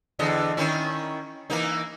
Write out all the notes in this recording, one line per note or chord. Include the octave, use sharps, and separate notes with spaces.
E2 D3 D#5
D#3 C#4 E4
E3 A#3 D#4